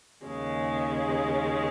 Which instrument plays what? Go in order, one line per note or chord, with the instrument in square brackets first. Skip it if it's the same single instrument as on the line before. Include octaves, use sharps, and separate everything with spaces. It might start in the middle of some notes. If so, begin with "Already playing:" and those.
[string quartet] D#2 C#3 G#3